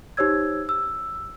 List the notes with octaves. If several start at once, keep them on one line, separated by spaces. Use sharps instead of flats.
D#4 G4 C5 C#5 E6 G#6
E6